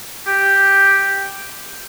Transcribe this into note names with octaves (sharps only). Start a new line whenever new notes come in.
G4